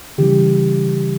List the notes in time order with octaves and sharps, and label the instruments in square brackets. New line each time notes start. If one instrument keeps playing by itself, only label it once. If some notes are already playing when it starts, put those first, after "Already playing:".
[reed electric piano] C#3 E3 G3 G4